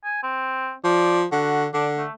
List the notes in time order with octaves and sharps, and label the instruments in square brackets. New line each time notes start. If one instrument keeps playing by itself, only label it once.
[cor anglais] G#5
C4
[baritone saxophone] F3 [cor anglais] D5
[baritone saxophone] D3 [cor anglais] F#4
[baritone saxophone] D3 [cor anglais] D4
[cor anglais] A3